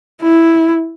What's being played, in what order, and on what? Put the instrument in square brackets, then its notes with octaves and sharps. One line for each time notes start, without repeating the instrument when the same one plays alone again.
[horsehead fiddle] E4